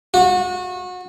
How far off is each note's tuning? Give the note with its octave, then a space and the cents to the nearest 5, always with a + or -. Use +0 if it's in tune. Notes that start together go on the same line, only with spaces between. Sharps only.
F#4 -30